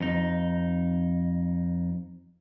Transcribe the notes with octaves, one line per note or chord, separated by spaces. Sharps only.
F2 D#4